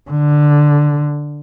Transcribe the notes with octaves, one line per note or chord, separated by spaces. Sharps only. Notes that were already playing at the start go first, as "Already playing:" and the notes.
D3